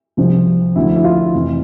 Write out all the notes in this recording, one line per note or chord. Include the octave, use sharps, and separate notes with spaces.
C2 C3 F3
D2 D3 F3 E4
E4
F4
F1 F2 E3